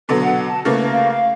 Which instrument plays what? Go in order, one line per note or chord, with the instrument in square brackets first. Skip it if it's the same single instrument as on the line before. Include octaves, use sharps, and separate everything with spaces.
[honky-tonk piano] B2 D3 F#3 [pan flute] B4
[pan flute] F#5
A5
[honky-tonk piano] C#3 A3 A#3 [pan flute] B4
[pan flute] F5
F5